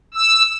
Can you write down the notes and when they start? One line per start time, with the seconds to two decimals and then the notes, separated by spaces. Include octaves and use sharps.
0.14 E6